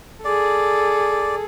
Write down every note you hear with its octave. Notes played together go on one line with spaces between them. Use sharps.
G#4 A4 D5